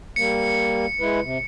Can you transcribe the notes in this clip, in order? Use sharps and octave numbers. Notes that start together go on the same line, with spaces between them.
G3 A#3 C#7
G#3 E4 B4
C3